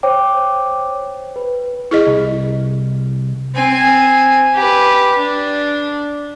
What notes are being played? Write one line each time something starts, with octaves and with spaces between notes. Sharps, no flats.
C5 C#5 G5 D6
B4
E4 G#4 D#5
C2
C4 G#5
G4 B4
D4